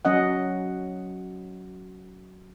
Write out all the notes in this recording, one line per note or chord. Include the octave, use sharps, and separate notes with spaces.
F#3 C#4 D#5 F#5